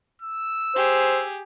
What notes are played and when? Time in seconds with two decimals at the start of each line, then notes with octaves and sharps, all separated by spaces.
0.22 E6
0.75 G4 G#4 C5